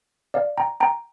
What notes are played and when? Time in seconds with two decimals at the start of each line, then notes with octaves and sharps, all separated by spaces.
0.34 D5 F5
0.58 G5 A#5
0.80 G5 A#5